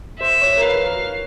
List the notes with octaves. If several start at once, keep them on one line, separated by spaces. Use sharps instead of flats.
C5 E5
C#5
A#4
B4 F5
A#4